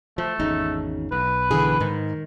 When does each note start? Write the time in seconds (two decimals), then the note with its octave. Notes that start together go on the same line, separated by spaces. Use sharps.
0.18 F3 A3
0.40 G#1 E2 C#3 D#4
1.12 B1 B4
1.51 D3 E3 G#4
1.81 G#2 D#3